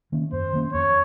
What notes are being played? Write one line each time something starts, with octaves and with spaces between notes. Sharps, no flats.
D#3 A#3 C#4
F#2 C5
D#3 A#3 C#4
F2 C#5